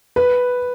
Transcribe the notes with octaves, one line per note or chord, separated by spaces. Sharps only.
B4